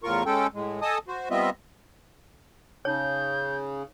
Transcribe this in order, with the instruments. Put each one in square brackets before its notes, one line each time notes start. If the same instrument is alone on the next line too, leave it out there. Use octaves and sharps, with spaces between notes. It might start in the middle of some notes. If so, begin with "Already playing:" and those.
[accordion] E2 A2 F4 A#4 C#6
G#3 C#4 A4 G5
A2 G#3
A4 D#5 G#5 A5 D#6
F#4 C5
G3 B3 C4 F4 D#5 E5
[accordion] C#3 [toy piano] D#4 C#5 [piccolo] G6